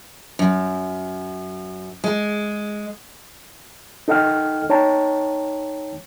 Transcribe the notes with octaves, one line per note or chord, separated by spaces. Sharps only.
F#2
G#3
D#4 A4 D#5 F#5 G5 F6
D#4 C#5 G5 A5 A#5